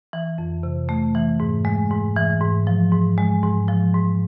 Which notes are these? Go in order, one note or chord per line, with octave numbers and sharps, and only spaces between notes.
E3
F2
C3
A3
E3
G#2
G#3
G#2
E3
G#2
F3
G#2
G#3
G#2
F3
G#2